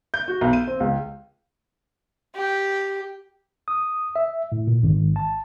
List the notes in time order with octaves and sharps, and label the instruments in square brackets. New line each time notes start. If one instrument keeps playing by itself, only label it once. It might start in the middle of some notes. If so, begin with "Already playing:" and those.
[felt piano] G6
F#4
B1
D#7
C4
C#2
[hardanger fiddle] G4
[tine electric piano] D#6
E5
A2
A#2
G#1
A5